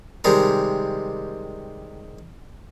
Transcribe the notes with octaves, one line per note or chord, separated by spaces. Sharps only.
C3 D#3 G3 G#3 A#4